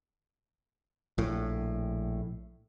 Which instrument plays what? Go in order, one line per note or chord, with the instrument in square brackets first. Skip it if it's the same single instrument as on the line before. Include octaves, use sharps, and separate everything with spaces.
[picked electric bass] A#1 A2